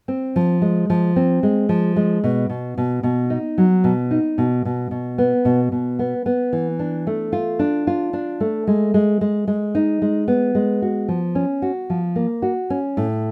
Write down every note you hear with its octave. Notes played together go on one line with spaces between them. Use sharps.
C4
F3
G#3
F3
C4
G#3
F3
G#3
B2
B2
B2
B2
D#4
F#3
B2
D#4
B2
B2
B2
B3
B2
B2
B3
B3
E3
D4
A3
F4
D4
F4
D4
A3
G#3
G#3
G#3
G#3
D#4
G#3
B3
G#3
F#4
F3
C#4
F#4
F3
A#3
F#4
C#4
A2